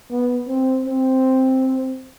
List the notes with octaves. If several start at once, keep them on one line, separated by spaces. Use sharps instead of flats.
B3
C4
C4